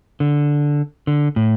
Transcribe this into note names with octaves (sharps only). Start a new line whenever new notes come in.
D3
D3
A2